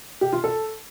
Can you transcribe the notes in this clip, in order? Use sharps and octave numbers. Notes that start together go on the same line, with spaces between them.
G4
F4
A4